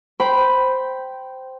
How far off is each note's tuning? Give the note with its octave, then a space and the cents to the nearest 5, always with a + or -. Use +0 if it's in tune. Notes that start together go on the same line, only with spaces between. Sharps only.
C5 -5 G5 -10 B5 +0